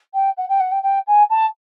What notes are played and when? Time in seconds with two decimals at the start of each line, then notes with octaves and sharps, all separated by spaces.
0.14 G5
0.37 F#5
0.49 G5
0.60 F#5
0.72 G5
0.83 G5
1.07 G#5
1.30 A5